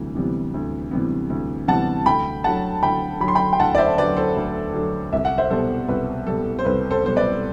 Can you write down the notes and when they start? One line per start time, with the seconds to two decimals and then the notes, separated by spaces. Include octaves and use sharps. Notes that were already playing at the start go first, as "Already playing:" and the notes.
Already playing: D2 C3 E3 G3
0.15 C3 E3 G3 B3
0.54 D2
0.91 C3 E3 G3 B3
1.30 D2
1.67 C3 E3 G3 B3 F#5 A5
2.06 D2 G5 B5
2.44 D3 F#3 F#5 A5
2.83 D2 G5 B5
3.20 F#3 B5
3.24 D3 C6
3.35 G5 B5
3.53 G5
3.59 D2 F#5 A5
3.75 D5
3.78 C5 E5
3.97 D3 F#3 B4 D5
4.16 A4 C5
4.36 D2
4.74 D3 F#3
5.13 C2 E5
5.25 F#5
5.38 C5 E5
5.50 B2 G3 A4 C5
5.88 C2 B4
6.27 B2 G3 A4
6.59 C5
6.65 C2 B4
6.91 A4 C5
7.03 B2 G3 C5
7.16 B4 D5